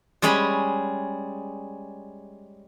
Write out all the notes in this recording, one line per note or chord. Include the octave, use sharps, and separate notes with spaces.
G3 G#3 C#4 G#4 B5